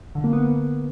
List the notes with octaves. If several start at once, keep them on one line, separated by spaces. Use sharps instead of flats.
D3
A#3
B3